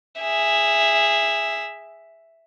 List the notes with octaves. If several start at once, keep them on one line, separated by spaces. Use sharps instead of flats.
G#4 E5